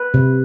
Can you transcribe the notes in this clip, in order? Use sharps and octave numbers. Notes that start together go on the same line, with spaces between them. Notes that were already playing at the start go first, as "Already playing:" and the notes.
Already playing: B4
C3